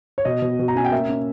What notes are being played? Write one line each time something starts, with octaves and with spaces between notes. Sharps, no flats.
C#5
B2 D#5
B2
B2
A#5
C#4 G#5
G5
A#3 E5
C#4